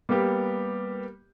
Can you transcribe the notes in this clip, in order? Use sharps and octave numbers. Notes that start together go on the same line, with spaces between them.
G3 A#3 B3 G4